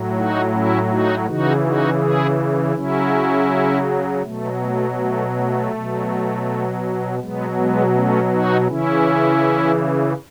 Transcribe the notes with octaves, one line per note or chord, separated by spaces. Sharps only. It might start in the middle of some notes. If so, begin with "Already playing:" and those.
Already playing: A2 F#3
D#4 F#4
C#4 E4
D#4 F#4
C#3 E3 D#4 F#4
D#4 F#4
E4 G#4
C#3 F#3 C#4 E4
B2 F#3 A3
A3
A3
A3
B2 F#3
B2 F#3 G#3 B3
G#3 B3
A3 C#4
D#4 F#4
C#3 E3 C#4 E4